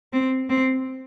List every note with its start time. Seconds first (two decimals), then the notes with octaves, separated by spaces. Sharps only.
0.13 C4
0.49 C4